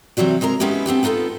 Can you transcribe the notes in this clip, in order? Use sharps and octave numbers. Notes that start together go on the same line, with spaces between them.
C3 E3 F#3 G3 F#4
C3 G#3 A#4 A#5
G#3 B3 C#4 D#4 E4 G4
B3 C4 D4 G4
B3 D#4 F4 G4 A4